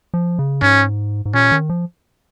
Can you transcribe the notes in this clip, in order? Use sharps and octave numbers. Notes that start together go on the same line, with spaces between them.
F3
C#3
G#2 C#4
G#2
A#2 C#4
D#3
F3